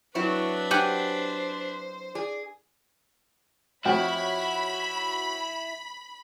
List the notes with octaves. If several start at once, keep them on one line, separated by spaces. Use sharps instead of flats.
F#3 C4 D4 E4 B4 C#6
G4 C5 F#5 G#5
G#4 D5
F2 E4 F#4 C#5 G5 B5